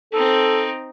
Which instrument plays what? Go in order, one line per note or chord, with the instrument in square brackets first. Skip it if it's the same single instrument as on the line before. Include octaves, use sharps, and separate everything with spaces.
[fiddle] C4 D#4 [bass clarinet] A4